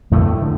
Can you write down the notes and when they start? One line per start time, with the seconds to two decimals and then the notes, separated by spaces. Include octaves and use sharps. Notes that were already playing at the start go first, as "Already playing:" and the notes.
0.11 F2 A2 D3 A3
0.42 D3